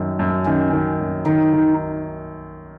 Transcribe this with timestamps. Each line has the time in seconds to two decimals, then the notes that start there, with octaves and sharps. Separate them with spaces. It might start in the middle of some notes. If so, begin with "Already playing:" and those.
Already playing: F#2 D#3
0.19 F#2
0.46 D#3 C#4
0.73 D#3
1.00 F#2
1.26 D#3 D#4
1.53 D#3